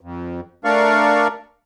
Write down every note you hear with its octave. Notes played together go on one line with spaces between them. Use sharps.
F2
A3 D4 A#4 D5 F5 C#6